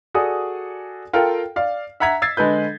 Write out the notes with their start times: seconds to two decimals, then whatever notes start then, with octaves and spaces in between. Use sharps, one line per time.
0.14 F#4 G#4 A4 D5 D#6
1.13 F4 A4 A#4 F5 G5
1.56 D5 F5
2.00 E5 F#5 A#5 G#6 B6
2.22 E6 G#6 A6 C7
2.37 D3 G#3 A4 B4 G6